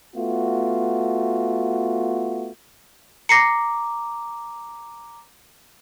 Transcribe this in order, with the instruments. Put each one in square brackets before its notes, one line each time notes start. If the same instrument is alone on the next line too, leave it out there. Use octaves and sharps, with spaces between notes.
[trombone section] A3 B3 F4 F#4
[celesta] A#5 D6 [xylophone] A#6 C7 C#7